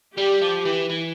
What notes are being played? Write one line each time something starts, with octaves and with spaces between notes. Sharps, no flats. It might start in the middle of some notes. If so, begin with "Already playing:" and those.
G3 G4
F3
E3
E3